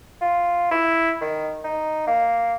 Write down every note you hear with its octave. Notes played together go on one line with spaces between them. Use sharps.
F4
E4
D#3
D#4
A#3